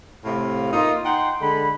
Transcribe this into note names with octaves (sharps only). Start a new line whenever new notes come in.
A2 C3 F5
A#3 D#4 F4
D#4 F#5 G5 C6
D3 G#3 A4 B5